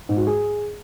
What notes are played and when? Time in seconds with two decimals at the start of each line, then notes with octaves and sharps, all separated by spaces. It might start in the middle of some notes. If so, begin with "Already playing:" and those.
0.09 G#2
0.17 F#4
0.27 G#4